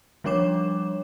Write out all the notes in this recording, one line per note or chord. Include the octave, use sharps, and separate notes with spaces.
F3 G3 D4 C#5 D6 E7